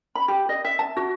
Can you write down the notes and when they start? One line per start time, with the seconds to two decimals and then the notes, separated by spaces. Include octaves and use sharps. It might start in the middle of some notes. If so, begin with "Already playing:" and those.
0.15 B5
0.28 G4
0.49 D#5
0.65 E5
0.79 A5
0.97 F#4